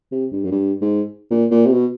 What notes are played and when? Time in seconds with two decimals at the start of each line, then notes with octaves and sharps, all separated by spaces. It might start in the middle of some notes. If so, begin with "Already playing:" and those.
0.12 C3
0.32 G2
0.44 F#2
0.51 G2
0.81 G#2
1.31 A#2
1.51 A#2
1.66 C3
1.72 B2